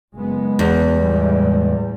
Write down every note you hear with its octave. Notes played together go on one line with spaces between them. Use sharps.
F#1 G#3 B3
E2
A2 G3 G#3